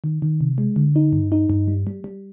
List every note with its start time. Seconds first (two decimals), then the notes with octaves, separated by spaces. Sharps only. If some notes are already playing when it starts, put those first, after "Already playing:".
0.04 D#3
0.22 D#3
0.41 C3
0.58 G#3
0.76 D3
0.96 D#4
1.13 G2
1.32 D#4
1.50 G2
1.68 G3
1.87 G3
2.04 G3